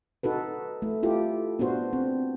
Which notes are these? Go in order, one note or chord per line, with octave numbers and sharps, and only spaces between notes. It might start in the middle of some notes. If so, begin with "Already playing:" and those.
D#4 F#4 A4 B4
A3
E4 F4 G4 A4
B3 D4 F#4 C5
C4